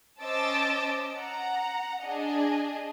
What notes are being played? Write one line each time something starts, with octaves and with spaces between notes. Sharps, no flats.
C#4 C5 D#5 A5 D6 E6
F#5 A#5
D4 G#4 D#5